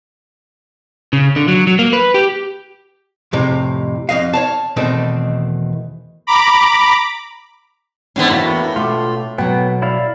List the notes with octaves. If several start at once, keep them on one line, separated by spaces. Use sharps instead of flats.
C#3
D3
F#3
F#3
A#3
B4
G4
F2 A2 C3 G4
F2 E3 D#5 F5
C#5 F5 A5
E2 B2 D#3 A3 C4
A#5 B5 D6
G#2 D3 B3 C#4
E2 A2 A#3 B3 F#4 F5
B2 A3 F4 A4 D6
B2 F#3 B3 G5
E4 D5 F5